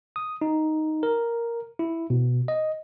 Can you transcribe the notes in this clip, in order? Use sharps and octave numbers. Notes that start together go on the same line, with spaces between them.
D#6
D#4
A#4
E4
B2
D#5